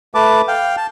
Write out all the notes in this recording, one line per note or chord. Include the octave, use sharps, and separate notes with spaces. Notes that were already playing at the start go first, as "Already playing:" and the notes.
A3 B4 A5 D6
F5 G5
A5